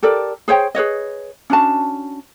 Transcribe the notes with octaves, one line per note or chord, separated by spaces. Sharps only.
G4 A4 A#4 D5
G#4 C5 C#5 G5
G#4 B4 C#5 D#5
C#4 D4 F#4 A5